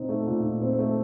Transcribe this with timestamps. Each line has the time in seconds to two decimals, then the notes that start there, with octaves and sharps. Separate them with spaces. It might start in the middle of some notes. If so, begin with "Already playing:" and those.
Already playing: A#2 C4 D#4
0.09 A3
0.27 A#2
0.44 D#4
0.62 C4
0.79 A3